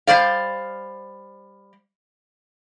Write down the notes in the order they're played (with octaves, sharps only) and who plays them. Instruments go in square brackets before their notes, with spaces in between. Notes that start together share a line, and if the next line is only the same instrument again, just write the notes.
[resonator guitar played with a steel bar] G3 C5 D5 F5